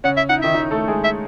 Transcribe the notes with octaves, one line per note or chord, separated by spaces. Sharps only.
C#3 C#4 F#5
E5
D#4 F#5
E4
D#3 D#4 E5
D#3 D#4
A3 A4
G#3 G#4
E5